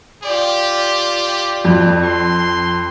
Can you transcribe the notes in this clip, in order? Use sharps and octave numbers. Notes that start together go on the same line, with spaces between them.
F4 G4 D5
F2
C6